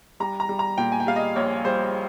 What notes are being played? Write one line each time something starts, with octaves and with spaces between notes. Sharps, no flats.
G3 A#5
A#5
G3
A#5
A#2 G5
G#5
G5
G3 F5
D#5
A#1 C#5
G3 C5